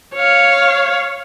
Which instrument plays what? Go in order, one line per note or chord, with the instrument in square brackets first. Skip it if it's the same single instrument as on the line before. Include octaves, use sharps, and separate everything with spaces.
[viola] C#5 F5